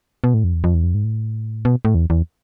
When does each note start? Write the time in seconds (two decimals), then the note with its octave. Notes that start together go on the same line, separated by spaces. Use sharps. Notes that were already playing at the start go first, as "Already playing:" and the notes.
0.24 B2
0.34 A2
0.44 F2
0.54 E2
0.64 F2
0.74 E2
0.84 F2
0.94 G#2
1.04 A2
1.65 B2
1.85 A2
1.95 E2
2.10 E2